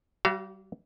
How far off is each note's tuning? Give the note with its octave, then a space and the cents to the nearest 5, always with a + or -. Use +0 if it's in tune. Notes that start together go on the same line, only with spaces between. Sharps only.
G3 -30 F#4 +20 F5 -35